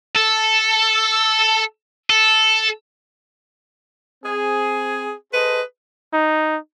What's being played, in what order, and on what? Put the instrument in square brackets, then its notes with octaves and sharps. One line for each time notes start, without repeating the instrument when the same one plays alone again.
[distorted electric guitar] A4
A4
[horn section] C4 G#4
G#4 A4 B4 C5 D#5
[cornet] D#4